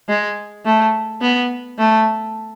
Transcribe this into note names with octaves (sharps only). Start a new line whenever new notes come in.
G#3
A3
B3
A3